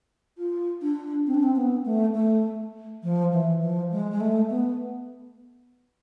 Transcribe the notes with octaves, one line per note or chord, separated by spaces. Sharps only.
F4
D4
C4
D4
C4
B3
A3
A3
F3
E3
F3
G#3
G#3
A3
B3